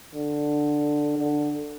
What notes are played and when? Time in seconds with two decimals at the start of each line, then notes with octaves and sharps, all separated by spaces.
0.15 D3
1.19 D3